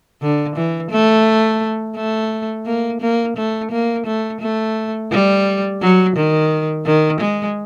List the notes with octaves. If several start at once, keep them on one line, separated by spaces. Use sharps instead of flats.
D3
E3
A3
A3
A#3
A#3
A3
A#3
A3
A3
G3
F#3
D#3
D#3
G#3